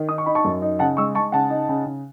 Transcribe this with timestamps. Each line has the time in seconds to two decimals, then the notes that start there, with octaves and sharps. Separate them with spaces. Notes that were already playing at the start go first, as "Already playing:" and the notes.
Already playing: D#3
0.08 D#4 D#6
0.18 C#6
0.26 D#4 B5
0.35 A5 C#6
0.45 F#2
0.62 D#4
0.79 C#3 F#5 A5
0.97 G#3 C#6 E6
1.15 G#3 A5 C#6
1.32 C#3 F#5 A5
1.50 D#4
1.69 C#3
1.86 C#3